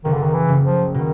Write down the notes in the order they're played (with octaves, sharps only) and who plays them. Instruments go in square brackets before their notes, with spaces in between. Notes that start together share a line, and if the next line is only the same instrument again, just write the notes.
[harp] F#1 [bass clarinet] D#3
[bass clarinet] D3
D#3
E3
[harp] F#1
[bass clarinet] F3
[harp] B2 [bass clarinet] D#3